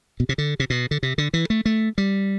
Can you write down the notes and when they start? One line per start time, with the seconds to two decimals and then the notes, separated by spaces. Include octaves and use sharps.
0.20 B2
0.29 C3
0.38 D3
0.60 C3
0.70 B2
0.91 D3
1.03 C3
1.18 D3
1.34 E3
1.50 A3
1.66 A3
1.98 G3